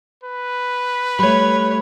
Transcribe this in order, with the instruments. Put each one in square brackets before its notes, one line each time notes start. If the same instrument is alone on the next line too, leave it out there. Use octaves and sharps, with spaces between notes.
[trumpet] B4
[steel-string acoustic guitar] G3 A3 [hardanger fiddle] C#5 [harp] B5